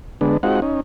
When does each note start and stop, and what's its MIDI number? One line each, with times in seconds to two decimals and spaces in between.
0.21 0.37 50
0.21 0.37 56
0.21 0.37 59
0.21 0.37 62
0.43 0.60 56
0.43 0.60 60
0.43 0.60 63
0.43 0.60 65
0.43 0.60 66
0.43 0.60 78
0.62 0.80 61
0.62 0.80 63